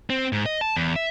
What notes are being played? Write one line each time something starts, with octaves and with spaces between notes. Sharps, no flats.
C4
G#2
D#5
A5
E2
E5